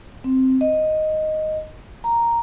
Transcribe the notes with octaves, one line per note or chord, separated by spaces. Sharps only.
C4
D#5
A#5